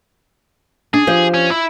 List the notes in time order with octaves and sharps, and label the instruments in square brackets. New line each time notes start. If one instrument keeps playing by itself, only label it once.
[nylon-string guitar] D4 [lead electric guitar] G#4
[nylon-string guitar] F3 G4 C5
[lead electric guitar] C#4
E4